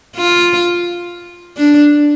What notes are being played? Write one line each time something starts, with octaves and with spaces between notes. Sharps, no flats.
F4
D4